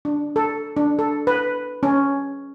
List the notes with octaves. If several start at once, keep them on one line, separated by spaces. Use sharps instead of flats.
D4
A4
D4
A4
B4
C#4